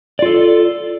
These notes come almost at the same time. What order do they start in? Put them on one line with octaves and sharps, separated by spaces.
D5 F4 A4